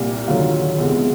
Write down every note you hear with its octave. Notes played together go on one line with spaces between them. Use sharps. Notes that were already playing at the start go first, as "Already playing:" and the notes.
Already playing: C2 A#2 G3
D#2 D3 F#3 F4
C2 B2 G#3